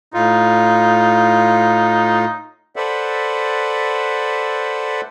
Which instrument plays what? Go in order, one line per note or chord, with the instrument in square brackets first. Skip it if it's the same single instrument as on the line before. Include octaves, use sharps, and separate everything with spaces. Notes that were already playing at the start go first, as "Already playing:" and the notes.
[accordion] A2 F4 [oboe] D#4
[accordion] A4 B4 C5 D5 E5 F#5